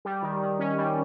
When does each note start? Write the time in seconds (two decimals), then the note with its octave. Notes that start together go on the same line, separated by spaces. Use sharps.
0.05 G3
0.22 D#3
0.41 D#3
0.59 C#4
0.77 G3